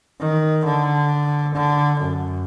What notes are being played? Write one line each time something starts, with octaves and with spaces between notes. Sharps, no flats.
D#3
D3
D3
F#2